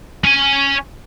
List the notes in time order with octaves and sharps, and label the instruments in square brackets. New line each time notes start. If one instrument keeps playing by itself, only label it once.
[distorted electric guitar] C#4 G#5